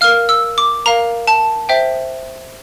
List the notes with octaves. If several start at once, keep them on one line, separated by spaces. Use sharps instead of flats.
A#4 F5 F6
E6
D6
A#4 F5 A#5
A5
C5 E5 G5